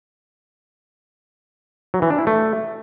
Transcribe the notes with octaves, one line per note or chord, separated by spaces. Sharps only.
F#3
E3
D4
E4
A3